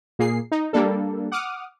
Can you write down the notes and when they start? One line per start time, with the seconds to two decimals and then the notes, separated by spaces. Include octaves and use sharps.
0.19 A#2 A#3 G#4 C7
0.52 D#4
0.73 G3 A#3 D4 A4
1.32 F#5 D6 D#6 F6